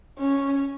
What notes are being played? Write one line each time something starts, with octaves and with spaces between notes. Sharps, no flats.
C#4